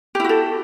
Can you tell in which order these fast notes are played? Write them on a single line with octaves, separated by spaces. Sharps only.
G4 E4 F#4 A4